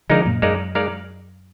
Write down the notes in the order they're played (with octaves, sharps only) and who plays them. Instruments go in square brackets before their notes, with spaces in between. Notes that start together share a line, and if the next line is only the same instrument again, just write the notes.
[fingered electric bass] D3 F3 [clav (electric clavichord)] G#3 D#4 A#4 D5 F5
[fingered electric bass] F#2 A#2
[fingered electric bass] F#2 [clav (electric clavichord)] G#3 D#4 A#4 D5 F5
[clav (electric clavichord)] G#3 D#4 A#4 D5 F5